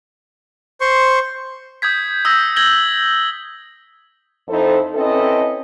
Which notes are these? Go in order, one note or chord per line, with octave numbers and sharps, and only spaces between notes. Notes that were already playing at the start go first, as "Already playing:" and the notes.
C5 C6 C#6
D#6 G6 G#6 B6
D#6 E6 G6 G#6 A#6
G#6 A#6 F#7 G7
F2 D#4 E4 A4 C5
C4 C#4 E4 A4 B4 D#5